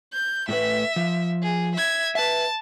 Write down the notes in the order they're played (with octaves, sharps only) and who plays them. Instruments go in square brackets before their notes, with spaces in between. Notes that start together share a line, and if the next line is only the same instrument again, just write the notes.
[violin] G6
[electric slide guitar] A2 A3 B4 [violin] E5
[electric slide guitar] F3
[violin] G#4
E5 G#6
[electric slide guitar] B4 E5 [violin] A5